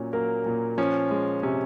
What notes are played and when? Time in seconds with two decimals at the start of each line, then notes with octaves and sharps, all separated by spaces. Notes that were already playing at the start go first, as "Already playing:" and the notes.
Already playing: A#2 F#3 C#4
0.13 F#3 A#3 A#4
0.46 A#2
0.78 F3 C#4
1.11 G#3
1.43 C3 C#4